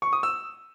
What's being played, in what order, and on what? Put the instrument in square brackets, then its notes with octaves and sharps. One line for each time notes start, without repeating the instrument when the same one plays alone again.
[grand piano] C#6
D#6
E6